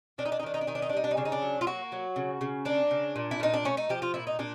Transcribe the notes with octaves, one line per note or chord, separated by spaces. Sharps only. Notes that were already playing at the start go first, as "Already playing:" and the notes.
D#3 D4
D#4
D4
D#4
D#3 D4
D#4
D4
D#3 D#4
D4
D#4
D4
G3 D#4
D4
D#4
C#3 D4
D#4
D4
F#3
F4
A#3 F#4
F#3
C#3
C#3
A#3 D4
C#3
A#2
E4
A#2 D#4
D4
A3 C#4
D#4
F3 G4
F4
A#2 E4
D#4
A#2 D4